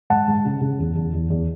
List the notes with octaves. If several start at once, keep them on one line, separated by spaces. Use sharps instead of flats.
G#2 F#5 A5
G#2
C#3
C#3
E2
E2
E2
E2